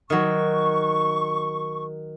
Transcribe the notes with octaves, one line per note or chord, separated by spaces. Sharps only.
D#3 F#3 C#6